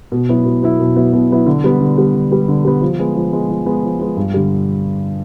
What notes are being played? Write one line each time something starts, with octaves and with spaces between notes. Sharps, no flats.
B2
F#3 B3 E4
B2
F#3 B3 E4
B2
F#3 B3 E4
B2
F#3 B3 E4
D3
G3 B3
D3
G3 B3
D3
G3 B3
D3
G3 B3
F3
G#3 B3
F3
G#3 B3
F3
G#3 B3
F3
G#3 B3
G2
D3 G3